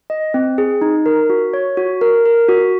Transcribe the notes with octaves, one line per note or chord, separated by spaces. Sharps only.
D#5
C4
G#4
D#4
A#4
F#4
C#5
F#4
A#4
A#4
F#4